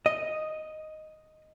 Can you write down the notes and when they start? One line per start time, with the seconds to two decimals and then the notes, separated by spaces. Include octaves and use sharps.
0.06 D#5